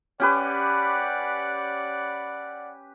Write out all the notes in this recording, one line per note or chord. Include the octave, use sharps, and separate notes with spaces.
C#4 G4 B4 D5 F#5